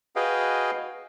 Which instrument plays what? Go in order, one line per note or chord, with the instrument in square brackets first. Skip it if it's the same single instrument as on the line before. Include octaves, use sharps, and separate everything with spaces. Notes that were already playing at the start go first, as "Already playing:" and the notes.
[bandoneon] F#4 G#4 B4 D#5 F5 G5